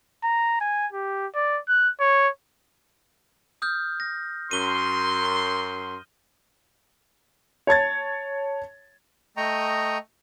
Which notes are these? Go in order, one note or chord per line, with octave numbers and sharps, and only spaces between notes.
A#5
G#5
G4
D5
F#6
C#5
D#6 F6 G6
A#6
F#2 C6 D#7 G7
C#5 A5 G#6 A6
A3 D#5 G5 A#5 C#6 D#6